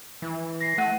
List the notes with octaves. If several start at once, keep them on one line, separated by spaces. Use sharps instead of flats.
E3
A#6 C7
A3 F#5 F#6 D#7